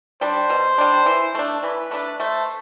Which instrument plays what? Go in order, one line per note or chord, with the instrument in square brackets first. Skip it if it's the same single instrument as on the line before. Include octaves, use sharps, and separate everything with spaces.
[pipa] G3 D4 [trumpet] C5
[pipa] B2
G3 D4
E3
A3 D4
[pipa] E3 [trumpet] B4
[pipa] A3 D4
[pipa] A3 [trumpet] C5